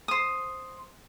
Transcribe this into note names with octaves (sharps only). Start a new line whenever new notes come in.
C5 D#6